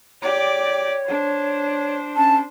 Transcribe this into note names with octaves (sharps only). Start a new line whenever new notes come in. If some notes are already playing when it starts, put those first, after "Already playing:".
G4 C#5 D5
D4 C5
C#4 A5